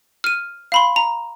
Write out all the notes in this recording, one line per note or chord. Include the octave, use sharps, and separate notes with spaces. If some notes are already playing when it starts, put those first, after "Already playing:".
F6 D#7
F5 B5 C6
A#5